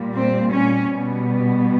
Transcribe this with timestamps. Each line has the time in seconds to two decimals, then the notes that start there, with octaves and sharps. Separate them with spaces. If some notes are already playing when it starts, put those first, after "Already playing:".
Already playing: A#2 G3
0.15 C4
0.53 C#4
0.93 B2 G3 B3